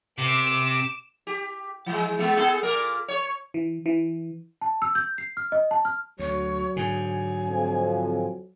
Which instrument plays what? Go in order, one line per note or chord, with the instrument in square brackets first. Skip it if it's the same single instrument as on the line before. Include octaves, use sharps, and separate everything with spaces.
[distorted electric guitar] C3 [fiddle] D6 [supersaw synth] E7
[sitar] G4
E3 G#3
G#3 B3
B3 G#4 A4
A#2 A#4
C#5
[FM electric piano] E3
E3
[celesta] A5
E6
G6
C7
F6
D#5
A5
F6
[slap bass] D2 [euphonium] F#3 [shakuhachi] C#5
[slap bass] G#2 D3 [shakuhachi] G#5
[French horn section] F2